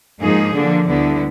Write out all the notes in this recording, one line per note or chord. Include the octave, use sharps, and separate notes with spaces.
G#2 F3 A#3 D#4 G#4
D3 F3 A#3 D4
D2 D3 G3 B3 E4